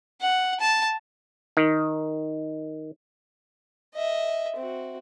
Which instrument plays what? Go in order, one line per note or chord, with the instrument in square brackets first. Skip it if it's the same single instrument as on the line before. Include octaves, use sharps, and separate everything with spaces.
[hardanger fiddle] F#5
A5
[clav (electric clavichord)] D#3
[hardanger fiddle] D#5 E5
C4 F#4